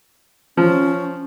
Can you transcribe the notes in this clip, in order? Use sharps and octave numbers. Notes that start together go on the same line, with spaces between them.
F3 C#4